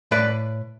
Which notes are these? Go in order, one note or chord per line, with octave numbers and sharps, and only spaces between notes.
A2 B4 D5